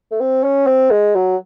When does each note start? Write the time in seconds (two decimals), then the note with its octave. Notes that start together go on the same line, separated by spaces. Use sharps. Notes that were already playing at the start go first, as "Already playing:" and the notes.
0.11 A3
0.20 C4
0.43 C#4
0.67 C4
0.91 G#3
1.15 F#3